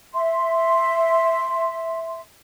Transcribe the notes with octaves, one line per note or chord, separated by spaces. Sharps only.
E5 C6